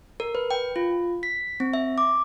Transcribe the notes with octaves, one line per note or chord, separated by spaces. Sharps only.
A#4
B4
G5
F4
B6
C4
E5
D6